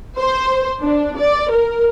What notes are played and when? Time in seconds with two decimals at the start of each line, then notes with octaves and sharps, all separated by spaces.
0.19 C5
0.82 D4
1.19 D5
1.53 A#4